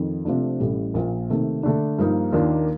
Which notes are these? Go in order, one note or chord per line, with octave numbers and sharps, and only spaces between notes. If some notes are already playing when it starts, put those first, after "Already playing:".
Already playing: F2 D#3
C3 F3 A3 D4
A1 A2 G3
A#1 A#2 F3
C3 D#3 A3
D3 A3 D4
G2 F3 A#3 D#4
D#2 D#3 A#3 D4 F4